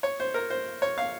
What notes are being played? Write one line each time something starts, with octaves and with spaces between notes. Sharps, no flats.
C#5
C5
A#4
C5
C#5
F5